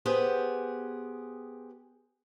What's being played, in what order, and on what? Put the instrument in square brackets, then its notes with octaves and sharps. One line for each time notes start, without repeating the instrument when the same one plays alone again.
[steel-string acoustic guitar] B3 G4 G#4 C5